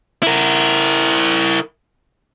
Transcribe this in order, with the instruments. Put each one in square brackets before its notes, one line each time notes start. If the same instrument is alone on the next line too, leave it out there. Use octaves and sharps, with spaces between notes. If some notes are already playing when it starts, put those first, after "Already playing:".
[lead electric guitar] E4 A#4